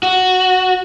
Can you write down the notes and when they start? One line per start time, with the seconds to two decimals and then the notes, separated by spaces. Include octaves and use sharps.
0.03 F#4